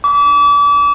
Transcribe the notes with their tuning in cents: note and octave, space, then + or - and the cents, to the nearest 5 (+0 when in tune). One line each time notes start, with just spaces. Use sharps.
D6 -35